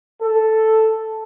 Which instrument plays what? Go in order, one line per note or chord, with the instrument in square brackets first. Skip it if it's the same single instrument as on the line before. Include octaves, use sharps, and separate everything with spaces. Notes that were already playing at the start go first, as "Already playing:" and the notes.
[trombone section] A4